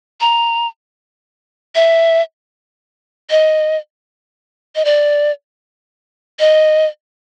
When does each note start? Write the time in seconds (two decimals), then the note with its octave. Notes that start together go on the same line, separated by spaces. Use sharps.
0.21 A#5
1.75 E5
3.30 D#5
4.76 D#5
4.85 D5
6.40 D#5